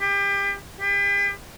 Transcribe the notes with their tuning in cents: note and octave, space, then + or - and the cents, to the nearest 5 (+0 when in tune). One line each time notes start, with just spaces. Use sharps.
G4 +30
G4 +40